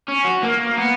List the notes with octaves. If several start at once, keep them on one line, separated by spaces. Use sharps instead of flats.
C#4
F#4
A#3
B3